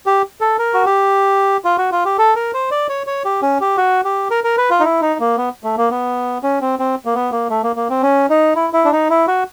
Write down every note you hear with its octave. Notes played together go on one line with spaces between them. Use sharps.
G4
A4
A#4
F#4
G4
F4
F#4
F4
G4
A4
A#4
C5
D5
C#5
C#5
G4
C#4
G4
F#4
G4
A#4
A#4
B4
F4
D#4
E4
D#4
A#3
B3
A3
A#3
B3
C#4
C4
C4
A#3
B3
A#3
A3
A#3
A#3
C4
C#4
D#4
E4
E4
D4
D#4
E4
F#4